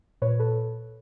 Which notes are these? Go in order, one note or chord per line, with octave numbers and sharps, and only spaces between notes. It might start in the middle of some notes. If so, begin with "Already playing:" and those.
A#2 B4 C#5
A4 B4